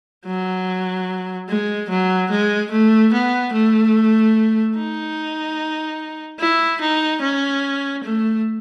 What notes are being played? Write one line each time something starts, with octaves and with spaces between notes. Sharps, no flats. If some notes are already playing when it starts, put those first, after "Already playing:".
F#3
G#3
F#3
G#3
A3
B3
A3
D#4
E4
D#4
C#4
A3